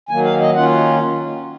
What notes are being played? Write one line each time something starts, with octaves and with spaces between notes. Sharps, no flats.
D#3 F#3 A#3 G#5
F5
D#5
D#3 A#3 C#4 F4 F#5